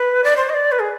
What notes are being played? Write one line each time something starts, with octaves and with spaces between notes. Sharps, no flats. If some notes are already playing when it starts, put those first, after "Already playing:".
Already playing: B4
D5
C5
D#5
D5
B4
G#4